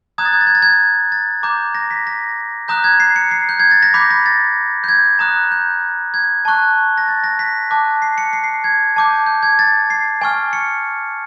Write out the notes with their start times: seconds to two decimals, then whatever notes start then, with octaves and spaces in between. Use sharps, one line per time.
0.18 A#5 D#6 F#6 G#6
0.25 A6
0.33 G#6
0.41 A6
0.47 G#6
0.55 A6
0.62 G#6
1.12 A6
1.43 A#5 D6 G6
1.75 A#6
1.91 B6
2.07 A#6
2.68 A#5 D#6 F#6 G6
2.84 G#6
3.00 C7
3.16 C#7
3.31 C7
3.49 G6
3.60 G#6
3.71 A6
3.83 A#6
3.94 B5 D6 G6 B6
4.11 A#6
4.26 A6
4.84 G6
4.89 G#6
5.19 A#5 D#6 F#6
5.52 G6
6.14 G#6
6.45 A5 C#6 F#6
6.98 A#6
7.08 A6
7.24 A#6
7.39 B6
7.71 A5 D6 F#6
8.02 C7
8.18 C#7
8.33 C7
8.44 C7
8.64 G#6
8.96 A5 D6 G6
9.26 G6
9.43 G#6
9.59 A6
9.90 C7
10.21 G#5 C#6 F6
10.53 C#7